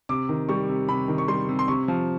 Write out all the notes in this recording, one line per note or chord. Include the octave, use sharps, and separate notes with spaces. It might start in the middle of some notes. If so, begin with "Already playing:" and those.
C3 D6
D#3
G3 C#6
C3
C3 B5
D#3
C#6
G3 C6
C3
C6
C3 C#6
F3